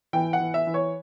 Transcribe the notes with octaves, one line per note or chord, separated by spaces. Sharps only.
E3 G5
F#5
E3
E5
E3
C#5